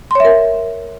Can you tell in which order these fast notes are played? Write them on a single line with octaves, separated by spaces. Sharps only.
C6 C#5 E5 A#4